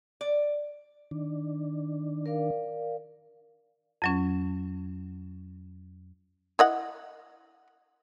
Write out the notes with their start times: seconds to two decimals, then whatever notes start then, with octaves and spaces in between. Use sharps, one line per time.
0.21 D5
1.11 D#3 D4
2.26 A#4 D5 F5
4.02 F2 F#3 C#4
6.59 E4 D#5 F#5